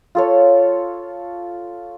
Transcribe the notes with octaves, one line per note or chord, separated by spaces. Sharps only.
F4 A4 C#5